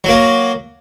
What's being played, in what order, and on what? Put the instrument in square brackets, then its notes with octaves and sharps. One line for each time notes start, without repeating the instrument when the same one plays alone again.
[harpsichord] F#3 A#3